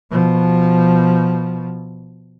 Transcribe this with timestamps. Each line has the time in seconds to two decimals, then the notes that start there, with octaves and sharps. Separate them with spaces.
0.11 B2 F3